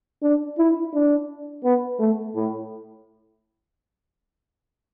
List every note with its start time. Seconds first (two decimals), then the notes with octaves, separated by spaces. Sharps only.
0.23 D4
0.58 E4
0.94 D4
1.64 B3
1.99 A3
2.35 A2